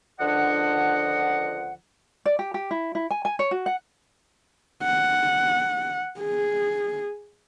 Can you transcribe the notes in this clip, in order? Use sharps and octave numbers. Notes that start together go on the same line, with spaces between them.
C#2 D3 F3 D4 D#5 F#5
D5
G4
G4
E4
E4
G#5
G#5
C#5
F#4
F#5
F#5
G#4